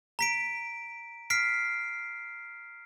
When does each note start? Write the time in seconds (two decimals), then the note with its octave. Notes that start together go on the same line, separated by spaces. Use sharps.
0.19 A#5 B6 D7
1.30 F6 B6 C7 D7